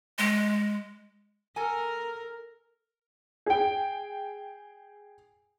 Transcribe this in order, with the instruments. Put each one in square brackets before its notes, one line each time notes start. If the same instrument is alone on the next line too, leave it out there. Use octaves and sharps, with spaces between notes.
[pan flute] G#3
[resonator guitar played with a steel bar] A4 G#5 [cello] A#4 [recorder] A#5
[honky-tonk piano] G#4 G5